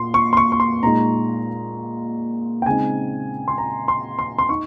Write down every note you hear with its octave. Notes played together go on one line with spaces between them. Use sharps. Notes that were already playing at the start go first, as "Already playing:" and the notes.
Already playing: A#2 C6
C#6
C6
C#6
C#6
C6
A#2 G#3 D#4 A#5
G5
C#3 G#3 C4 D#4 G#5
C6
A#5
C6
C6
C6
D#4 C#6